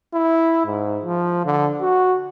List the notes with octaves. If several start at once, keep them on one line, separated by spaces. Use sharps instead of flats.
E4
G#2
F3
D3
F#4